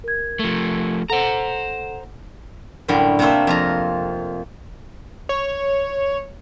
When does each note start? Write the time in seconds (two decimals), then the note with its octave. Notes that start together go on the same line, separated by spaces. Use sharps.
0.04 A#4 G#6
0.39 F3 A3
1.10 A4 C5 F#5 A#5
2.88 F#2 A2 D3 G3
3.19 C3 A3 A#3 C5 E5
3.47 F2 F4 A#5
5.29 C#5